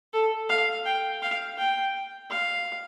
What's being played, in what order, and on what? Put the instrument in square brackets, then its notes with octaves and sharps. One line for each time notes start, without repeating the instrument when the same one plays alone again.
[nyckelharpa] A4
F5
G5
F5
G5
F5